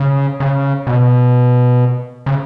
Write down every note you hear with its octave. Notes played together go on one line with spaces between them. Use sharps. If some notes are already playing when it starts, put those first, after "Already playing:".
Already playing: C#3
C#3
B2
C#3